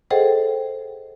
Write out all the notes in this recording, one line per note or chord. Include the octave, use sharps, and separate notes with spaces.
G#4 A4 C5 D#5 F#5 G5